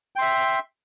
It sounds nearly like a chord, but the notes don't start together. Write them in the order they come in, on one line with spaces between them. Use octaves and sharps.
G5 C6 E5